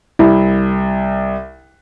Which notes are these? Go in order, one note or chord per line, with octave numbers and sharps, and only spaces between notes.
C2 E4